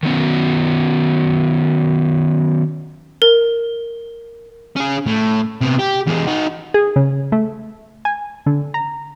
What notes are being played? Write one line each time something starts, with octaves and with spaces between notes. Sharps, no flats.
D#3 F#3 B3 C#4
A#4
C#4 G#4
A2
C3 B3
G4
E2 G#3
D#4 F#4
G#4
C#3
A3
G#5
D3
A#5